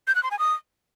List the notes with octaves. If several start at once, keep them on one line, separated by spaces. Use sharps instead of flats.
G6
F#6
C6
G#5
D#6